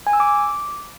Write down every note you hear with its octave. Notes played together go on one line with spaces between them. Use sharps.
G#5
E6
D6